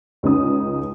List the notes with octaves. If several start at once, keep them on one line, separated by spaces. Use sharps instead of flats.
C#2 C#3 C#4 D#4 D#6